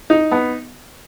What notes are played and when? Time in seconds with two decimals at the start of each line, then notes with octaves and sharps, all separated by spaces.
0.10 D#4
0.31 B3